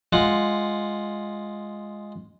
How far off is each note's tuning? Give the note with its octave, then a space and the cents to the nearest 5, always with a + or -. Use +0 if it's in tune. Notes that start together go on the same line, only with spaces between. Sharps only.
G#3 +0 F4 +0 F#5 +0